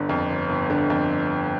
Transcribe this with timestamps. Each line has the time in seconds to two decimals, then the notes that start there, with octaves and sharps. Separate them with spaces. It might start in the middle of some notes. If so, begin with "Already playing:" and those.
Already playing: G1 D3
0.09 F2
0.30 G1
0.49 G1
0.70 D3
0.90 F2